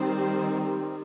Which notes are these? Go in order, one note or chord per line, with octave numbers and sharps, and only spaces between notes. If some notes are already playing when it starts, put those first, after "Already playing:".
Already playing: D#3 G3 C4 C5